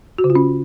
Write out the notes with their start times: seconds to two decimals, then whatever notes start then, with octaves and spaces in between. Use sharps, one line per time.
0.18 F#4
0.24 C#3
0.30 F4
0.35 C#4